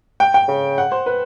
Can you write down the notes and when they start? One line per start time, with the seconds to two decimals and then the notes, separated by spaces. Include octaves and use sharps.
0.20 G5
0.34 G5
0.48 C#3
0.78 F#5
0.92 C5
1.06 B4